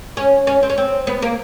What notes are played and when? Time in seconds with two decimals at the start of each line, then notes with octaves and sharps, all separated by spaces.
0.17 C#4
0.47 C#4
0.63 C4
0.70 C#4
0.78 C4
1.07 B3
1.22 A#3